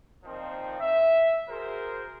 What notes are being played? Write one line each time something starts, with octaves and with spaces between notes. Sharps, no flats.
A#2 D#3 F3 C4 D#4
E5
F#4 G#4 A#4 C5